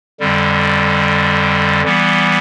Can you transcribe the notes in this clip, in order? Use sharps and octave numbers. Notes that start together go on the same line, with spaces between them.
F2 D3 G3
E3 G3 B3